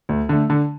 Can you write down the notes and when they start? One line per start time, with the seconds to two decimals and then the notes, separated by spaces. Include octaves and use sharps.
0.09 D2
0.29 D3 A3
0.50 D3